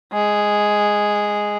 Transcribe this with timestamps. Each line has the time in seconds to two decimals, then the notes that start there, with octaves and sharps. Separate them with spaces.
0.13 G#3